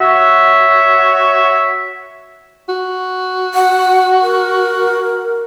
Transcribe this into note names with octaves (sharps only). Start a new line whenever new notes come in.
F#4 C#5 E5
F#4
F#5
A#4